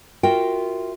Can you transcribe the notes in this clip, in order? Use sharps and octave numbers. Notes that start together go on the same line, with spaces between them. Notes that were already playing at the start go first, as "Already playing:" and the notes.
F4 F#4 A#4 E5 G5